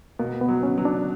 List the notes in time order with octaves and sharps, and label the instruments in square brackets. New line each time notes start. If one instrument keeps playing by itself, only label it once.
[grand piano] B2 [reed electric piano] A#3
[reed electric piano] B3
[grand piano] F#3
[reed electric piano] C#4
[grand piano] F#3
[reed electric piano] D4